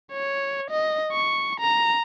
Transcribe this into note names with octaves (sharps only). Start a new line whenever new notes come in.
C#5
D#5
C#6
A#5